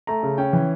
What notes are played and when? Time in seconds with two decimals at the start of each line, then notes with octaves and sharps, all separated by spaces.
0.07 A3 A#5
0.23 C#3
0.38 C#4 G5
0.53 E3